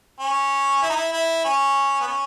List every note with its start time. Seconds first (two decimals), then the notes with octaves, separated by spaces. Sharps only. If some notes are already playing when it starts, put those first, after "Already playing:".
0.20 C#4
0.82 E4
0.90 D#4
0.96 E4
1.13 E4
1.45 C#4
2.01 B3
2.07 C#4